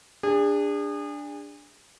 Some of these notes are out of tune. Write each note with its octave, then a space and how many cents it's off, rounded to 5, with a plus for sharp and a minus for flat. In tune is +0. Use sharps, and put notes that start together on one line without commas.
D4 +0 G#4 -35